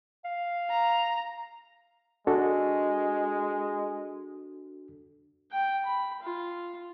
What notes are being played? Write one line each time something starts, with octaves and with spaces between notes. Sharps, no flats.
F5
A#5
G#3 D4 F#4 A4
G5
B5
F4